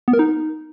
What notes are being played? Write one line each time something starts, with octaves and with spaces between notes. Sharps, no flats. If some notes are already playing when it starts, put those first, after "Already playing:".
B3
A#4
D#4